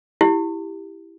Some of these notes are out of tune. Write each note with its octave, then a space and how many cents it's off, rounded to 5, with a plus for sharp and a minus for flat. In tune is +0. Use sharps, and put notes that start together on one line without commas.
E4 +0 G4 +5